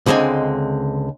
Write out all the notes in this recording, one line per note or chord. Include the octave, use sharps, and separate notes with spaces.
C#2 D3 G#3 C4 G#5